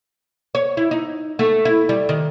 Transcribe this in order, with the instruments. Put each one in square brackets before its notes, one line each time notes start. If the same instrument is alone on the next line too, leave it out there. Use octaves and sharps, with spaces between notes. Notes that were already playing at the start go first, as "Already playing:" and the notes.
[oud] C#5
E4
D#4
A3
E4
G3
D#3